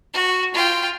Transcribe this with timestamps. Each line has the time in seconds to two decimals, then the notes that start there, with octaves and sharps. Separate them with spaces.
0.14 F#4
0.54 F4 G5